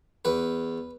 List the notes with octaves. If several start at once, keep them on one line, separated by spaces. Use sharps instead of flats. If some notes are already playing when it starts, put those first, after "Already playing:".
E2 B4